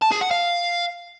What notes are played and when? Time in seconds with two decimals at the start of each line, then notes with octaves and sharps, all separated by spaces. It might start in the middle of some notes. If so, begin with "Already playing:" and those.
0.02 A5
0.11 G#4
0.21 F#5
0.31 F5